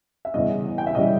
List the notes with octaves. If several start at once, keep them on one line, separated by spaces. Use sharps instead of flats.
E5
E2 C#3 E3 G3 D#5
G5
E5
C#3 E3 G3 D#5